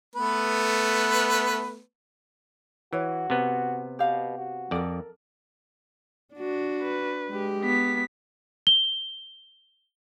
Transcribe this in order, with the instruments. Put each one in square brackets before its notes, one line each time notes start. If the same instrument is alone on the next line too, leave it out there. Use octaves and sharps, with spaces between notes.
[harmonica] A3 B3 B4
[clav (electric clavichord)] E3 [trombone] F#4 [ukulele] B4 C#5
[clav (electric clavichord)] C3 B3
[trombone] B2 [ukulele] G4 F5
[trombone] F#4
[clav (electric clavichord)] F2 D5 [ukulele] A4 A#4
[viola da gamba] D4 F#4
[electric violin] B4
[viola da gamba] G#3 G4
[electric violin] B3 B6
[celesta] G7